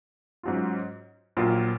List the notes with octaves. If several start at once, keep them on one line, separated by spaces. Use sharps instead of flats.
G#2 F#3 C#4 F4
A#1 A#2 F#3 A#3 F4